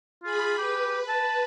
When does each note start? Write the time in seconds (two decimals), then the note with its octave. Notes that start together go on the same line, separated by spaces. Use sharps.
0.24 F4 G#4 B5
0.58 G4 B4
1.09 A5